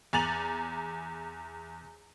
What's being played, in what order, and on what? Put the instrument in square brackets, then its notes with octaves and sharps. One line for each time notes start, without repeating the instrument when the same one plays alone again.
[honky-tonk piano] E2 G#5 A#5 A6 F7 F#7